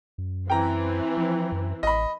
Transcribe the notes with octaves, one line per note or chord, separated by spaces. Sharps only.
F#2
E3 C4 G5 A#5
F3
F#2
A1 D#5 B5